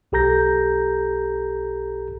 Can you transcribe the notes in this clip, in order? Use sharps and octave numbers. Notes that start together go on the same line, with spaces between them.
B1 G4 A4 A#5 G6 A#6